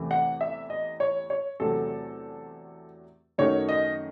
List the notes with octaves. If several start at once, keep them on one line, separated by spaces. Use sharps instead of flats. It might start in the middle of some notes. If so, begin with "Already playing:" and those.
Already playing: E2 C3 E3 A3
F#5
E5
D#5
C#5
C#5
E2 C3 F#3 A3 A4
F#2 D#3 F#3 A3 C#5
D#5